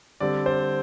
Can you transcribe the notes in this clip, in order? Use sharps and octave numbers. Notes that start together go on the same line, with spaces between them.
D3 G3 C4 D5
C5